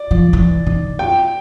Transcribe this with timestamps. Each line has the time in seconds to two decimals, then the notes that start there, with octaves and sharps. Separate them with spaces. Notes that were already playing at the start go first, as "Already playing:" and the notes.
Already playing: D5
0.11 F3
0.33 E3
0.66 D#3
0.99 G5